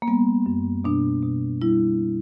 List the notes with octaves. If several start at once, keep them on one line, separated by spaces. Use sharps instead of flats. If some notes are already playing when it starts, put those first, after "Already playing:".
A#3
G3 B3
F#2
B2 D4
B2
G3 E4